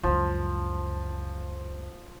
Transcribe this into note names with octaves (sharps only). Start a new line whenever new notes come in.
C#2 F#2 F3